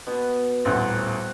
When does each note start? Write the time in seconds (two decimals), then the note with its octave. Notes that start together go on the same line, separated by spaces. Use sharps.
0.07 B2 B3
0.65 D#1 A1 C4 F#5